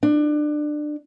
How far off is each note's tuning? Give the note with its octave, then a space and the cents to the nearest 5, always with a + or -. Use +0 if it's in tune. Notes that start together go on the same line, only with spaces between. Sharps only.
D4 +25